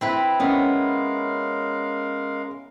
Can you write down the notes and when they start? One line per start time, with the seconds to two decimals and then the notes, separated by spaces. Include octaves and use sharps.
0.01 C4 E4 B4
0.40 G#3 B3 C#4 A#4 F5